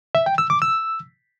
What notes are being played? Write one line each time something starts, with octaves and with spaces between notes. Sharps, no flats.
E5
G5
E6
D6
E6